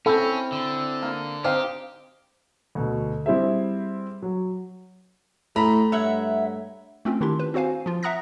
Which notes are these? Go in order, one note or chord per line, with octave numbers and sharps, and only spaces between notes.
C4 C#4 E4 A4
D3
A#3
C4 D#4 G4 F5
D2 B2
G3 C4 E4 G#4 C5 E5
F#3
A2 A3 A#5 B5
G2 C#5 E5 F#5
A3 C4 C#4 F4
D#3 D4 E4 G4 C6
B4
C4 F#4 C5 F5 G#5
F3 F4
E5 F#5 A#5 D#6 F#6 A#6